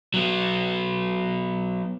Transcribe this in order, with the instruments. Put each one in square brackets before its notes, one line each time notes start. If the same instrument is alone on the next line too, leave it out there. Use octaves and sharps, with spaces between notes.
[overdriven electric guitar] F#3 B3